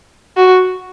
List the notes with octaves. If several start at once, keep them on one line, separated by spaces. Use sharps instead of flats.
F#4